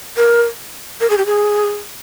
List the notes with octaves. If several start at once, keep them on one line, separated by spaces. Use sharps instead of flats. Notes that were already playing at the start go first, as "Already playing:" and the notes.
A#4
A#4
G#4
G4
G#4